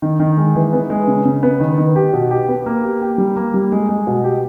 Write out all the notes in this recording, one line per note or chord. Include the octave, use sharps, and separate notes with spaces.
D#3
D#3
G#3
E3
B3
G#3
C#3
C#3
B3
D#3
D#3
G4
B2
G4
B3
A#3
G4
G4
G3
A#3
G3
G#3
G#3
B2
G4